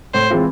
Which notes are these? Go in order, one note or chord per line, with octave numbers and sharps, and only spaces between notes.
A2 C5
E3 G#3 C4 F4